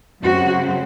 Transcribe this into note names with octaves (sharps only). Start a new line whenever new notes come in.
F#2 C#3 F#3 A3 C4 F#4